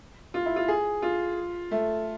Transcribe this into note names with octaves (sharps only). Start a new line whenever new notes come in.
F4
E4
F4
G#4
F4
A3